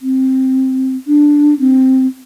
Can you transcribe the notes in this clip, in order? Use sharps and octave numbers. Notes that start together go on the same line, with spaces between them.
C4
D4
C4